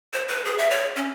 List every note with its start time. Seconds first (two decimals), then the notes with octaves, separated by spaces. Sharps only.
0.13 C5
0.28 B4
0.45 G#4
0.58 E5
0.71 C#5
0.96 C#4